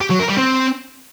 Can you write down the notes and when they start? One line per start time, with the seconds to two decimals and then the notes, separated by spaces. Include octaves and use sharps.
0.01 G4
0.10 F#3
0.19 A#4
0.28 G3
0.38 C4